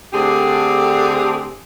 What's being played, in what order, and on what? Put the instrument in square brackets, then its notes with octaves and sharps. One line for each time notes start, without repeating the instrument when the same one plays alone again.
[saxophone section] D3 A3 C4 D4 G4 G#4